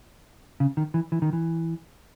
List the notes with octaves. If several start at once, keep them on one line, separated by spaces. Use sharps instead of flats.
C#3
D#3
E3
E3
D#3
E3